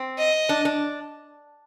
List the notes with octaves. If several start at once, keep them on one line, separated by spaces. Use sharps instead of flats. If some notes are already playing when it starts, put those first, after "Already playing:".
Already playing: C4
D#5
D4
D4